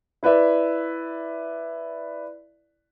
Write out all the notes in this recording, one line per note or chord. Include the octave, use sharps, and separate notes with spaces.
E4 B4 D5 E5